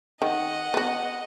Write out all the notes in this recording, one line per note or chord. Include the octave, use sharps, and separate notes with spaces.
D#3 D#5 F#5
B3 F#4